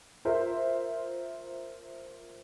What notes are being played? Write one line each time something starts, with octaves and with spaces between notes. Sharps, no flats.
F4 A#4 C5 E5 C6